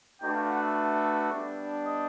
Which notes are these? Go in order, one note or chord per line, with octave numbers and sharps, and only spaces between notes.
A3 D4 F#4 B4 G5
F5
F#5
E5
G3 B3 D4
D#5